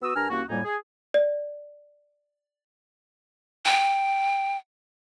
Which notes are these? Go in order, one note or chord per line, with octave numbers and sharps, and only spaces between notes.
B3 F#4 D#6 E6
G2 D4 A#4 G#5 A#5 F6
C2 A#3 C#4 F#4
F2 A2 G3 A#3 D#4 G#5
G#4
D5
G5